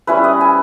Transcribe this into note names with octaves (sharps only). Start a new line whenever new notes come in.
G3 C#4 E4 B4
D#5
G#5